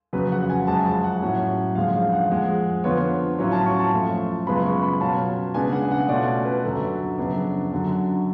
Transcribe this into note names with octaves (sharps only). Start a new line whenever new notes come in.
F2 C#3 F#3 B4
F#5
G#5
F#2 F3 G#3 A5
A5
F#5
A2 F#3 C#4
F#2 D3 F3 G#3 F5
F5
F#5
F2 F3 G#3
D3 F3 B3 F4 C#5
A2 F#3 C#4 F4 C#5
A5
C#6
A5
F#2 F3 A3 F4
F#2 C#3 G#3 B3 F4 B5
C#6
B5
B2 F#3 C#4 F4 A5
C#3 G#3 B3 D4 G#5
F#5
F#5
B2 A3 C#4 F4 D5
B4
F#2 D3 F#3 A4
F#2 C#3 F3 B3 D4
F#2 D3 F#3